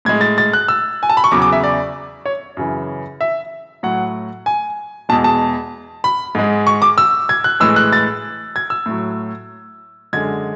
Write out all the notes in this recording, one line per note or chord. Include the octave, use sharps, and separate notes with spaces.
A2 G#3 G#6
A6
A6
F#6
E6
G#5
A5
B5
C#6
E2 C#3 F#3 D6
D6
E5
D5
C#5
F#2 C#3 E3
E5
A2 F#3 F#5
G#5
E2 B2 G#3 A5
A5
B5
G#2 G#3
C#6
D6
E6
G#6
F#6
A2 E3 G#3 E6
F#6
A6
G#6
E6
A2 F#3
F#2 D3 G#3 G#6